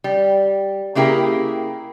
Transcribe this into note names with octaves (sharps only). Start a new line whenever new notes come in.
G3
C#3 A#3 E4 G4 G#4 A#4